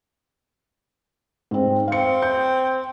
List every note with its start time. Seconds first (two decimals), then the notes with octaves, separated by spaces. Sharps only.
1.51 G#2 C4
1.88 C4 F5 C#7
2.22 G6